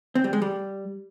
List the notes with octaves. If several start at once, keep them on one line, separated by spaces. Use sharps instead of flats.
C4
G3
G#3
G3